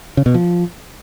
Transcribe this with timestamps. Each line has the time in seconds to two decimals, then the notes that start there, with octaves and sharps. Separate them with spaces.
0.17 C#3
0.26 B2
0.34 F3